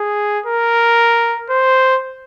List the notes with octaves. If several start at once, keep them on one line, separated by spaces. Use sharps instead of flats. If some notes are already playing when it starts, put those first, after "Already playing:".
Already playing: G#4
A#4
C5